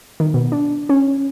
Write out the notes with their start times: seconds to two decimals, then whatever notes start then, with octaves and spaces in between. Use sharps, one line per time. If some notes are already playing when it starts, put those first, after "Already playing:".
0.20 D#3
0.34 B2
0.52 D4
0.89 C#4